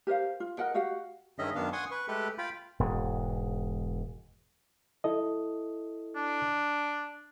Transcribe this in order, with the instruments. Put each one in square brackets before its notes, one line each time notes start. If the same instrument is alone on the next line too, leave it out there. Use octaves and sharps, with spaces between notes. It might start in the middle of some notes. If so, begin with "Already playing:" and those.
[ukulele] G4 A#4 C5 F5
F4
A#4 D#5 F#5 G5
F#4 G4 F5 F#5
[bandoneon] G2 D#3 C#4 G#4 D#5 E5
F#2 D#3 B3 D4 F5
F#5 G#5 C6 C#6 D#6
B4 C#6
G#3 A3 G4 A4 B4
F4 F5 G5 B5
[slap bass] E1 G#2
[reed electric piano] E4 A4 D#5
[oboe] D4